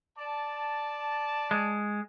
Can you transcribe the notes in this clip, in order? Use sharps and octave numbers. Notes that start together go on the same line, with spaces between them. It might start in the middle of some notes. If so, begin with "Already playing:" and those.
D5 A5
G#3